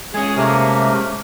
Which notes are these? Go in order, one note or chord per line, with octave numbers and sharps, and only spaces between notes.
G#3 C#4 G#4
C3 A3 A#3 A#4